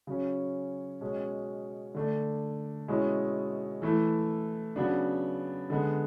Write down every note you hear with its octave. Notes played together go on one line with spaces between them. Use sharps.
C#3 F#3 C#4
B2 G#3 C#4
D3 A3 D4
B2 G#3 C#4 E4
E3 A3 E4
C#3 F#3 B3 D4
D3 G#3 B3